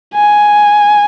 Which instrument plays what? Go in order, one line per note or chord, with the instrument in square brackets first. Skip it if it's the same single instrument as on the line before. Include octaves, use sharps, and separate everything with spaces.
[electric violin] G#5